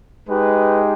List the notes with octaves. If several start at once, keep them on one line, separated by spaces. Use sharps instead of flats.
G#3 D#4 G4 B4